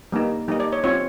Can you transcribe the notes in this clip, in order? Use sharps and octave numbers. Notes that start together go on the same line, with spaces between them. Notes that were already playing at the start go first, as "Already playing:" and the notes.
G3 A#3 D#4
G3 A#3 D#4 D#5
D5
C#5
C4 F4 C#5